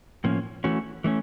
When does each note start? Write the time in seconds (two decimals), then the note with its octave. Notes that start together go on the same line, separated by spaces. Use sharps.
0.24 A2 F3 A#3 C#4
0.64 E3 A3 C#4 F#4
1.04 E3 A3 C#4